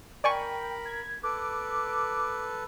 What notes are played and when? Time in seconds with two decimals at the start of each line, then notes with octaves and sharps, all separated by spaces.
0.24 A#4 D5 G5 G#5 B5 C#6
0.85 G#6
1.23 A4 B4 D6